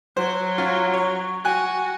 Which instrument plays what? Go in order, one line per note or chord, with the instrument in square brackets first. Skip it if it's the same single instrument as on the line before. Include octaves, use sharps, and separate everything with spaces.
[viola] F#3 [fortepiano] C5
[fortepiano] C#4 F4 F#4
C#5
[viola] F#4 [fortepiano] G5 G#5 F#6